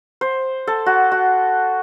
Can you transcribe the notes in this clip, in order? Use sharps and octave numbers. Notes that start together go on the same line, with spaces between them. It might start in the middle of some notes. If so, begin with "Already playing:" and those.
C5
A4
F#4
F#4